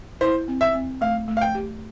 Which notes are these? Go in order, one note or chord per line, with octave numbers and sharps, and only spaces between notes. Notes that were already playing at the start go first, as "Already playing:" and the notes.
E4 C5
C4
E5
C4
A3 F5
A3
F5
G5
G4